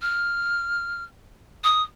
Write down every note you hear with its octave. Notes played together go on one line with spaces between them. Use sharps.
F6
D#6